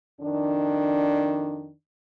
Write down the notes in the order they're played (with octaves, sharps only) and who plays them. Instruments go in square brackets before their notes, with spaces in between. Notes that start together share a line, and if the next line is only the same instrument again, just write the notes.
[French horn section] F2 D#3 D4